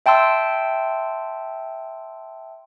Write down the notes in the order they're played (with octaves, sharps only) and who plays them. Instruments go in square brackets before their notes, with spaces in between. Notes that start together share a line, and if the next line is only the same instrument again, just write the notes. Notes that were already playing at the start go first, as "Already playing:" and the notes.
[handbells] E5 G5 A5 C6 E6